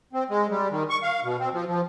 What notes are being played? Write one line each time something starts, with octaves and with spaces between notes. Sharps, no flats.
C4
G#3
G3
D#3
C#6
F5
B2
C4
F3
F3